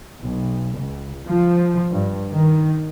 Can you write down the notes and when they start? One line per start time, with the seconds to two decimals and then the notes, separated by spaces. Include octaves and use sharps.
0.20 B1
0.74 C#2
1.26 F3
1.91 G2
2.31 D#3